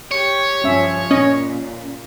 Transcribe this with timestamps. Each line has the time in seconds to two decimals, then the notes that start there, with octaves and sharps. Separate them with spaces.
0.11 G4 C#5
0.64 G2 F3 C#4 E5
1.11 A#2 C#4 D#5